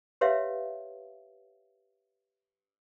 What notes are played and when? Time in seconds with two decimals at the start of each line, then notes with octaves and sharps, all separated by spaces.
0.21 G4 B4 C#5 E5 F5